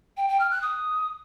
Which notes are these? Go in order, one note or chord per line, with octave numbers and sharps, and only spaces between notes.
G5
G5
F6
F#6
D#6